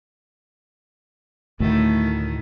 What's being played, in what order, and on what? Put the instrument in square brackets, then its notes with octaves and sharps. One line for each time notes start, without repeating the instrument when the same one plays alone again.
[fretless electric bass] D2 A2 [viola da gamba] D#3 A3